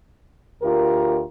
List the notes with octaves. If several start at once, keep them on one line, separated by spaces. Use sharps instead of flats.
D2 F4 G4 A#4